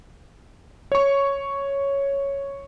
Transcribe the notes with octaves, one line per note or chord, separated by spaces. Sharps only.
C#5 C#6